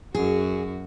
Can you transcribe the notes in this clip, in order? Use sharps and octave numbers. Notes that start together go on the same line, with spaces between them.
F#2 F#4 G#4